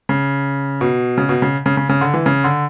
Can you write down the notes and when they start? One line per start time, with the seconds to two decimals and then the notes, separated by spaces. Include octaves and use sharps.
0.09 C#3
0.81 B2
1.18 C#3
1.29 B2
1.42 C#3
1.66 C#3
1.77 C#3
1.89 C#3
2.01 D3
2.14 E3
2.26 C#3
2.44 D3